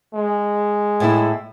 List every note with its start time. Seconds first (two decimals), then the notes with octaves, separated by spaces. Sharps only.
0.14 G#3
1.00 A2 A3 E4